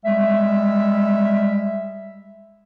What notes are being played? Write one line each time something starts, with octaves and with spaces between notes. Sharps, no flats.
G3 G#3 E5